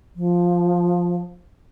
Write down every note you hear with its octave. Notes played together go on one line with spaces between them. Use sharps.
F3